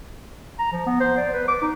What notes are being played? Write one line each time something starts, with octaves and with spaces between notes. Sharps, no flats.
A#5
F3
B3
C5
D5
B4
D6
D#4